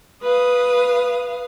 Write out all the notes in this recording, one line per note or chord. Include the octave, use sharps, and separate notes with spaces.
B4 F5 D#6